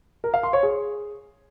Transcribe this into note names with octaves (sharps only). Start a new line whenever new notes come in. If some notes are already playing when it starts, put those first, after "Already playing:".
A#4
F5
C6
C#5
G#4